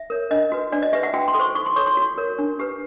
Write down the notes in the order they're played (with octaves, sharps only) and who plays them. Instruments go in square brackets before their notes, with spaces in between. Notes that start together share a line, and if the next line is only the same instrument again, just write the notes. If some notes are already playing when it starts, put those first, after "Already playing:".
Already playing: [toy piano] E5
A#4 C#5
D4 D#5
F#4 B4
D4 D5
D#5
G4 B4 E5
F#5
F#4 G5
C6
A4
C5 C#6
F#4 C#6
C6
A4 C#5 C#6
C6
F#4
A#4 C#5
D4
G4 B4